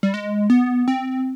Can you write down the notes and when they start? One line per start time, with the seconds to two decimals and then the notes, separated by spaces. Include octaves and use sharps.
0.03 G3
0.14 G#3
0.50 B3
0.88 C4